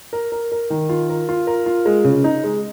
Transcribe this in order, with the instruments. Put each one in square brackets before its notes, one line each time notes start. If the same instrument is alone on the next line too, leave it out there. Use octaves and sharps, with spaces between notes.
[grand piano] A#4
A#4
A#4
D#3
F4
A#4
F4
A#4
F4
G#3
C#3
D#4
G#3